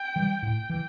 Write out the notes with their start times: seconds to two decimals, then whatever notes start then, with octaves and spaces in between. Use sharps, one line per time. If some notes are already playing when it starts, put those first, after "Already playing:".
Already playing: G5
0.16 E3 G3
0.42 A2 G5
0.70 E3